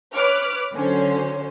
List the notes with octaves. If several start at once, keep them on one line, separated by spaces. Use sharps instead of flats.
B4 C#5 D6 F6 F#6
D3 F#3 C#4 C5